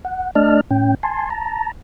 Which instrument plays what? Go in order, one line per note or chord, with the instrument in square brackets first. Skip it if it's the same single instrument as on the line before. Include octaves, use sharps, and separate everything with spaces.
[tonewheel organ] F#5
A3 D4 D5 D#5 A5 F6
A2 C#4 G5
G#5 A5 C6
A5 A#5